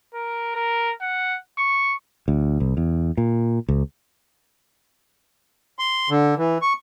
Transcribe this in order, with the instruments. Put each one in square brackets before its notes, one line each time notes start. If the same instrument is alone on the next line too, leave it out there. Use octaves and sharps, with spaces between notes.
[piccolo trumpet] A#4
A#4
F#5
C#6
[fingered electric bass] D2
C2
E2
A#2
C#2
[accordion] C6
D3
E3
C#6